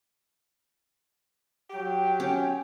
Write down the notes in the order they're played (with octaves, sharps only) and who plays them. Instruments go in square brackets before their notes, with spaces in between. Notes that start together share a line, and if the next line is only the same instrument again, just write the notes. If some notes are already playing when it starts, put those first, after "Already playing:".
[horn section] F#3 G4 [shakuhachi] G5
[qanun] C#4